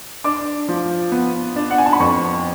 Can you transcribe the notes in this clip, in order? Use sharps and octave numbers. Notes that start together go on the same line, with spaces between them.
D4 D6
F3
B3
D4
F#5
G#5
A5
B5
F2 C#6